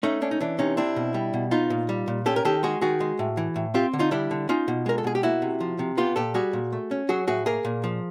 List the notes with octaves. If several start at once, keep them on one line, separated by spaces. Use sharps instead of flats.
A3 C#4 D#4
C#4 D4
D#4
E3 D4
C3 C#4 D#4
C4 D4 E4
B2
G3
B2
B3 D#4 F4
A#2
G3
A#2
C#4 G4 A4
A#4
D#3 G4 A4
G#3 F#4 G#4
D#3 F#4 G#4
G#3
A2
E3
A2
C4 F4 G4
D3
D#4 F4
G3 D4 E4
D3
C#4 D#4 F4
B2
G#3 A#4
A4
B2 G#4
G4
A#3 E4 F#4
C3
F3
C3
B3 F4 G4
A#2 G4 A4
G3 F#4 G#4
A#2
A3
C#4
F#3 F#4 G#4
A2 F#4 G#4
A#3 G#4 A#4
A#2
F3